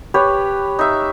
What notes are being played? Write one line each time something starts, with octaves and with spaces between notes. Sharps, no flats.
G4 B4 C#5
D#4 E5